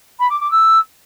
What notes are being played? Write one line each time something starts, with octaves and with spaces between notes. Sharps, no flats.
B5
D6
D6
E6